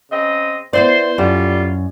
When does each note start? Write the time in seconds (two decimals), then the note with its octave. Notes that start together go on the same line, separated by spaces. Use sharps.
0.11 C#3 C4 D#5
0.73 B3 E4 C5 D5
1.18 F#2 D3 G3 F4